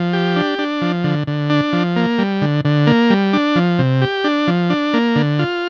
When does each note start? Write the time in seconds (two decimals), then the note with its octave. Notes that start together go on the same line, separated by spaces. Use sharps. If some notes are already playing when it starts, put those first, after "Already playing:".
Already playing: F3
0.13 G4
0.36 D4
0.59 D4
0.81 F3
1.04 D3
1.27 D3
1.50 D4
1.73 F3
1.96 A#3
2.18 G3
2.42 D3
2.65 D3
2.87 A#3
3.10 G3
3.33 D4
3.56 F3
3.79 C3
4.02 G4
4.24 D4
4.48 F3
4.70 D4
4.94 A#3
5.16 D3
5.39 F4